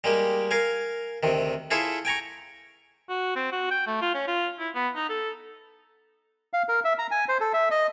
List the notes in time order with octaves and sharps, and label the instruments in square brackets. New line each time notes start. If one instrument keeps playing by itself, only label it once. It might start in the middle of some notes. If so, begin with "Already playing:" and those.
[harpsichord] G3 G#3 A#3 G4
A#4 F5 G#5
D2 C3 D#3
E4 F4 G#4 A4 C#5 E5
G5 G#5 A#5 C#6
[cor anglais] F#4
C4
F#4
G5
A3
F4
C#4
F4
E4
B3
D#4
A4
[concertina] F5
A#4
E5
A#5
G#5
C5
A4
E5
D#5